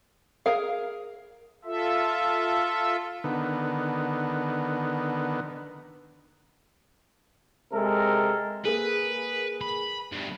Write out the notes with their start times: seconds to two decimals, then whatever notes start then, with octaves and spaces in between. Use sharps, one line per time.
0.46 G#4 A#4 F5
1.65 F4 A4 E5
3.24 D3 D#3 B3
7.72 C3 G#3 A4 A#4
8.65 A#3 G#4 B4
9.61 B5
10.12 D2 G2